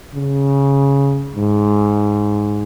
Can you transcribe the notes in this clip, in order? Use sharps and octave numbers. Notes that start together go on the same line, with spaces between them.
C#3
G#2